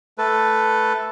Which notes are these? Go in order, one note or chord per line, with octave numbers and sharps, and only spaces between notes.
A3 A4 B4